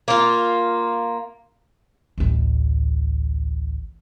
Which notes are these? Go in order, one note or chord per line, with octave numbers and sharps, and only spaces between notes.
A#3 F4
A1 D2